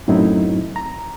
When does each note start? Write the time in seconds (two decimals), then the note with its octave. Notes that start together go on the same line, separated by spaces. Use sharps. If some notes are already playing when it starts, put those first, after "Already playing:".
0.08 F#2 A2 F#3 C4 D#4 E4
0.76 A#5